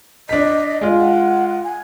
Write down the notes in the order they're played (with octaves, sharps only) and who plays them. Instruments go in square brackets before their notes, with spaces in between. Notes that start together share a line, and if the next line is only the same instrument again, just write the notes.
[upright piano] D4 B6 [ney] D#5
[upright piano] G#3 F4
[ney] F#5
G#5